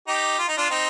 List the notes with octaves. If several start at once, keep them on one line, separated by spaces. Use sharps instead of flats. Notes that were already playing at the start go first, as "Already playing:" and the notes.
D#4 G4
F4
D#4
D4 F4
C4 D#4